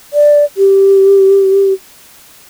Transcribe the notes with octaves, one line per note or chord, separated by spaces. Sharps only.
D5
G4